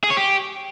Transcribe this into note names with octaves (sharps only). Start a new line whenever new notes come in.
G#4
C#5
G4